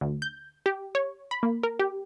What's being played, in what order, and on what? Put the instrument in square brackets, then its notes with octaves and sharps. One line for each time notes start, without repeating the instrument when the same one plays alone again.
[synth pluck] D2
G6
G4
C#5
B5
A#3
A#4
G4